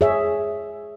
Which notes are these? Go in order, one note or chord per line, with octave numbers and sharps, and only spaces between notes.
G#4 C#5 E5